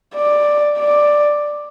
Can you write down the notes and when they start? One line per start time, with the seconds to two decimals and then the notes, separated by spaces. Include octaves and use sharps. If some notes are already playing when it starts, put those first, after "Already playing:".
0.15 D5
0.78 D5